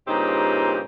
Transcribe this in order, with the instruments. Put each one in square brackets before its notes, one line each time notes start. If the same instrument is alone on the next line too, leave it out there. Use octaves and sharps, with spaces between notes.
[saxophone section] G2 A#2 C#3 C4 D#4 G4